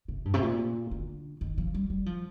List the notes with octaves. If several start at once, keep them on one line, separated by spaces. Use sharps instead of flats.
C3
G2
C3
A#2
D3
D#3
F3
G3
G3
F3